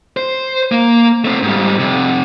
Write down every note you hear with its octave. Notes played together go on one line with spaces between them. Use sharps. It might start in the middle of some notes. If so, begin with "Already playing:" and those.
C5
A#3
A3 C4
G#2 G3
F2 C3